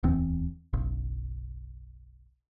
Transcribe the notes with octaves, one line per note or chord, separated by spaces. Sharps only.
D1 E2 E3 C4
F#1 B1